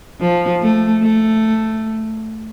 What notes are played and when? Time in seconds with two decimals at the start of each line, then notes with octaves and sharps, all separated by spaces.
0.21 F3
0.62 A3
1.02 A3